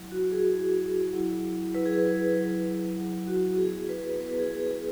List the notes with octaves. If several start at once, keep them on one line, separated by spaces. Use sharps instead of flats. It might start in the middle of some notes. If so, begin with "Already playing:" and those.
Already playing: F#3 E4
F#4
G#4
F#3 E4
F#3 E4
F#3 E4 B4
G#4
B4
F#3 E4
F#3 E4
F#4
B3 E4 G#4
B4
B3 E4 B4
G#4
G#4